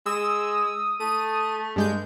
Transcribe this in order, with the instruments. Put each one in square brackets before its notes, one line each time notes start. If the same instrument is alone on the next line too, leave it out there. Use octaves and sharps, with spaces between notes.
[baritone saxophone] G#3 [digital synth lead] D#6 [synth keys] E6
[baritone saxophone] A3 [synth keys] D#7
[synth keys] G2 G#3 G6